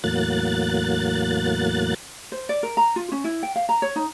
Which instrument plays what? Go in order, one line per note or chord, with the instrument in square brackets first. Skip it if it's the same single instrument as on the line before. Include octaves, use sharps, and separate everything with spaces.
[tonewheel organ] E2 A2 F#3 A#3 F#6 A6
[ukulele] C5
D5
A#4
A#5
F4
C#4
E4
G5
F5
A#5
C#5
D#4